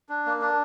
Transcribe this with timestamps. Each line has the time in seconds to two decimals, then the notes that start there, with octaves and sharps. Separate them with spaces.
0.09 D4
0.26 A#3
0.42 D4